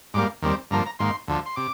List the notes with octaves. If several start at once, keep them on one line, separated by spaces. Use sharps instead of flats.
G#2 G3 A#3 D6
D#2 D#3 G3 C4
G2 D3 F3 A#3 A#5
A#5
G#2 D#3 A#3 C6
D2 D3 F3
C6
C3 D6